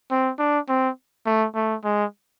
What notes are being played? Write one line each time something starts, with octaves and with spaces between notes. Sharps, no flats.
C4
D4
C4
A3
A3
G#3